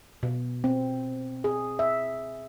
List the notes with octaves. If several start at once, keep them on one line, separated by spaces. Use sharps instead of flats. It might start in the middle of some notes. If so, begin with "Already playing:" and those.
B2
C4
G#4
E5